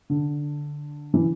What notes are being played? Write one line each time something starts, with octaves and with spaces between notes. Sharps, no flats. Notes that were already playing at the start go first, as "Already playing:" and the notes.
D3
E3